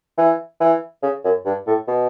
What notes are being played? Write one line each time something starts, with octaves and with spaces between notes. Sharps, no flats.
E3
E3
C#3
F#2
G2
A2
B2